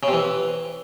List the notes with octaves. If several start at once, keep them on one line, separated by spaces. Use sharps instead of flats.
C#3
C3
E3